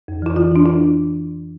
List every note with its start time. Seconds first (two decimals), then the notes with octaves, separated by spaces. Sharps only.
0.08 F2
0.22 E3 E4
0.36 E3 F4
0.51 E3 D4
0.66 E3 E4